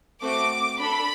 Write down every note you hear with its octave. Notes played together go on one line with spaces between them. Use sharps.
A3 C4 F#4 D6
D4 A4 B5